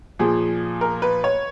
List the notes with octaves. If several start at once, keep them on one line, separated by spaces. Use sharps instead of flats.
A#2 F3 G#4
A#4
B4
C#5